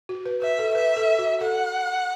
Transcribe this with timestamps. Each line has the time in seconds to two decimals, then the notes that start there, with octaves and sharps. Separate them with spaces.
0.09 F#4
0.26 B4
0.42 B4 E5
0.59 A4
0.74 B4 E5
0.97 A4
1.19 F#4
1.41 A4 F#5